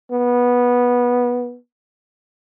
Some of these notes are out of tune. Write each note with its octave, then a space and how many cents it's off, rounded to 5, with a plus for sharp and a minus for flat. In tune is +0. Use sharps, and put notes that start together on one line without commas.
B3 -15